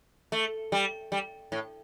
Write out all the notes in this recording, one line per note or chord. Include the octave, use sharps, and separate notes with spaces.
A3
G3
G3
A2